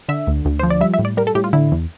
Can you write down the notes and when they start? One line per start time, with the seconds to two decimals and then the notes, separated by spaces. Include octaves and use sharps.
0.08 D3 E5
0.27 D2
0.45 D2
0.59 F3 C5
0.70 D5
0.81 G3 E5
0.94 E5
0.99 A2
1.05 D5
1.17 G3 A#4
1.27 A4
1.35 A2 G4
1.44 F4
1.53 D3 E4
1.72 E2